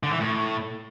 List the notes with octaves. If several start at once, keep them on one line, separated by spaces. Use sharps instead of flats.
D3
E3
A2